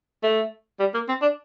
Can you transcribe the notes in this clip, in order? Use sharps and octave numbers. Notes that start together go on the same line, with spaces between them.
A3
G3
A#3
C4
D4